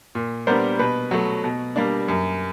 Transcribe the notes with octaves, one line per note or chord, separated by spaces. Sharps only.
A#2
G3 B3 D4 A#4 C5
B2 B4
F#3 A3
B2
G3 A#3 D4
F#2